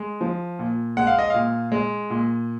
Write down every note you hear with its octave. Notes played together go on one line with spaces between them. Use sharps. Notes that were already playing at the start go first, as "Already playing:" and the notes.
Already playing: G#3
F3
A#2
G#3 F#5
F5
D#5
A#2 F5
G#3
A#2